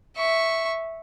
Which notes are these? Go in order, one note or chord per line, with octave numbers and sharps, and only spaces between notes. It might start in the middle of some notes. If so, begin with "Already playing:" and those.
E5 C#6